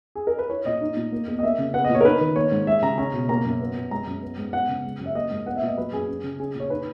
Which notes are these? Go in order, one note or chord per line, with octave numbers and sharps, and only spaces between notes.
G#4
A#4
B4
E4 C#5
A#2 D#5
D#4
A#2
A#3
E2
D#5
A#3 E5
C#3
B3 F#5
D#5
A#2
C#5
A#4
D#4 B4
D#3
A#3 C#5
G#2
G#3 E5
C#3 A#5
C#4 A#5
B2
A#3 A#5
F#2
B3
A#2
G#3 A#5
F#2
B3
G#2
B3 F#5
C#3
G#3
F#2
E5
A#3 D#5
G#2
B3 F#5
E5
A#2
D#5
F#3 B4
F#2 G#4
C#4
C#3
C#4 G#4
A#2
C#5
D#4 B4